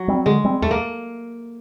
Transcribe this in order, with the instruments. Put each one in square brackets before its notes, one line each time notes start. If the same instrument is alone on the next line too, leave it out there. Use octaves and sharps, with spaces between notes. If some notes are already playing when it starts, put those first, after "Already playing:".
Already playing: [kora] F#3
[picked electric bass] G3 C4
[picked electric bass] D3 [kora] G#3
[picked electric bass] G3 C4
[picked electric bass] E2 [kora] A3
[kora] A#3